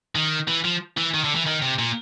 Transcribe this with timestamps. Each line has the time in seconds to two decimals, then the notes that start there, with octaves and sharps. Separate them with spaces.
0.15 D#3
0.48 E3
0.65 F3
0.98 E3
1.14 D#3
1.25 D3
1.35 E3
1.46 D#3
1.62 C3
1.79 A#2